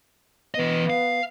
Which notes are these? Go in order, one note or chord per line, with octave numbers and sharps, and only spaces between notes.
E3 B3 D#5
F5